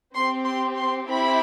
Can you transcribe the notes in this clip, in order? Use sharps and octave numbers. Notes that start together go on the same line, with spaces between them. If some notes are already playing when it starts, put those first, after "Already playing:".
C4 G4 C6
C6
C6
C4 E4 G4 B5